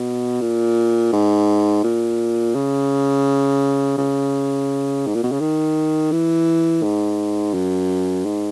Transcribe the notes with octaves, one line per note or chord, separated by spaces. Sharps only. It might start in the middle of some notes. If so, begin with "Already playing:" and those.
Already playing: B2
A#2
G#2
A#2
C#3
C#3
G#2
A#2
B2
C#3
D#3
E3
G#2
F#2
G#2